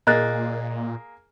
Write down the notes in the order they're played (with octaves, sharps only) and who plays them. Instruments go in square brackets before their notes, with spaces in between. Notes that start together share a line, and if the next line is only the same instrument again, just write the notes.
[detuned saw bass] A#2 [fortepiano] A#3 G#4 [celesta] D#5 F#6 A6